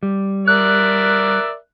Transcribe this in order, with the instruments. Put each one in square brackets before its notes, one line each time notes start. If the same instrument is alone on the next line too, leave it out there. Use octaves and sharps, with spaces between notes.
[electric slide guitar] G3
[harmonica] A#4 D5 E5 [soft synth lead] F#6